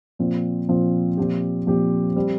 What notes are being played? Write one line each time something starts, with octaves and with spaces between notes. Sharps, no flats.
A#2 F3 C4 F4
A#2 F3 C4 F4
A#2 F3 C4 G4
A#2 F3 C4 G4
G3 C4